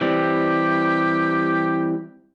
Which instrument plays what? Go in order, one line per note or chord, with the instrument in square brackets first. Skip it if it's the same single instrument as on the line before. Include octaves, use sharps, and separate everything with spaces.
[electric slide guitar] E3 G3 C4 [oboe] G4